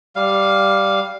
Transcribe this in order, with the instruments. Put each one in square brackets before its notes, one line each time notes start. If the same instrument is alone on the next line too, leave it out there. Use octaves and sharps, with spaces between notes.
[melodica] G3 F5